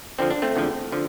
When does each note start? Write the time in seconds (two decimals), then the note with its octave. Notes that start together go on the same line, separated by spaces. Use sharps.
0.19 F2 D3 F3 C4
0.30 D4
0.42 A3 C4
0.56 E2 D3 F3
0.92 D3 F3